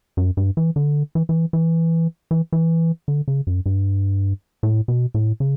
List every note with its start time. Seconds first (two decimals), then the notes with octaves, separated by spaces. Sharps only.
0.17 F#2
0.37 G2
0.57 E3
0.76 D3
1.15 E3
1.29 E3
1.53 E3
2.31 E3
2.52 E3
3.08 D3
3.28 C#3
3.47 F#2
3.66 G2
4.63 A2
4.88 B2
5.14 A2
5.40 C#3